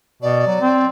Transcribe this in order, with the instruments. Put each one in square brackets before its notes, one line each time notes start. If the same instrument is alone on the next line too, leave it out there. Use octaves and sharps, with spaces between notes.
[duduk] B2 [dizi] D5
[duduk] F#3
C4